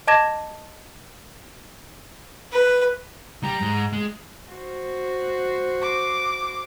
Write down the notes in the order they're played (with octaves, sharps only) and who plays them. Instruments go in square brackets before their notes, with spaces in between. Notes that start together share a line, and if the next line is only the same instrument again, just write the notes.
[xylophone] D#5 A5 D6 G#6 A#6 E7
[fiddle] B4
[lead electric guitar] G3 [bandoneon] A#5
[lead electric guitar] G#2
G#3
[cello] F#4 C5
[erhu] D6